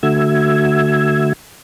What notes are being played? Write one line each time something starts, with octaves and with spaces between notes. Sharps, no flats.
D3 A3 F#4 E5 E6 G#6